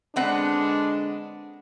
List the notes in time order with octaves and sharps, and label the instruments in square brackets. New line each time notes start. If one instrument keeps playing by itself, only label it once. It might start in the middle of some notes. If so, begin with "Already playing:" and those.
[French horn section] D3 G#3 D4 [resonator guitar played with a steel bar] B3 C4 F#5